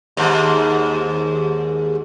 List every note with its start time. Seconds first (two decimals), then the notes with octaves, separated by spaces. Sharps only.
0.17 D#2 G#2